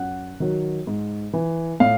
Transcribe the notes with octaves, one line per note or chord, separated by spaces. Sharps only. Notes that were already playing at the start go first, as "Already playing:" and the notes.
Already playing: F#2 F#5
D#3 F#3
G#2
E3
A2 F5